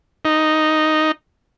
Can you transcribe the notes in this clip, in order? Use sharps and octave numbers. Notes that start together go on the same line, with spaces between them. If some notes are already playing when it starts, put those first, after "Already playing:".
D#4